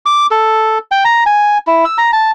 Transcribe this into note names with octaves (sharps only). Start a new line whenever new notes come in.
D6
A4
G5
A#5
G#5
E4
E6
A#5
A5